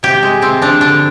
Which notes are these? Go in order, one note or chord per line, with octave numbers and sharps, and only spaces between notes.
C3 G4
G#3
C3 C4
F3 D4
D3 D4